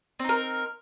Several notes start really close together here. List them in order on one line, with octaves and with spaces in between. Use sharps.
C4 D#4 A#4